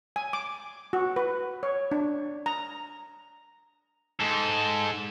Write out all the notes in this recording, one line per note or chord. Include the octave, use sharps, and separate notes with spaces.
G#5
D6
F#4
B4
C#5
D4
A#5
G#2 A4